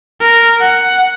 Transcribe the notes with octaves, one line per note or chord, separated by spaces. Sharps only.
A#4
F#5